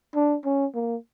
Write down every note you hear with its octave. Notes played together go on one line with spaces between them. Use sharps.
D4
C#4
A#3